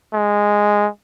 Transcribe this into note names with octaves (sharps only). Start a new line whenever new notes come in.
G#3